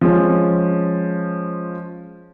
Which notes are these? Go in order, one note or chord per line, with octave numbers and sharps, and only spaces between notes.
F3 G#3 C#4